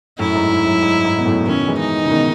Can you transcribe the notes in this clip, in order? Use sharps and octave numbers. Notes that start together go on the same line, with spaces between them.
F#2 A2 E4
G#2
G#2
F#2
G#2
G#2
B2
F#2 A2
B2 D#3 C#4
E3 G#3
D#4
C#3
B2 D#3